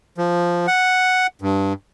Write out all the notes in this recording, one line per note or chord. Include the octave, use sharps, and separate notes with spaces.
F3
F#5
G2